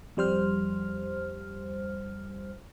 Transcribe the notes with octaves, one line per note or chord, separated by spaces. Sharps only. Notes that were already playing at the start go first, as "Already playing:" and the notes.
F2 G3 C5 F6